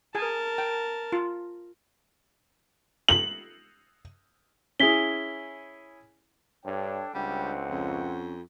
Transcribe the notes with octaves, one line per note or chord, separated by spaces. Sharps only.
G#4 A#4 G#5 A5
G5
F4
F#7
C#4 E4 G#4 B6 G7
G2 D4 A4 C#5 G5
C#2 G3 C4 D4 C5 F#5
F2 C#4